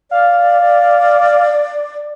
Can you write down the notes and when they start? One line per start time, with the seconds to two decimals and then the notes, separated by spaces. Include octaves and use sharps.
0.11 D5 F5